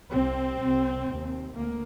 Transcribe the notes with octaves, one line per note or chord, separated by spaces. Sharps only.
C2 C3 C4
C2 C3
D#2
D2 A#3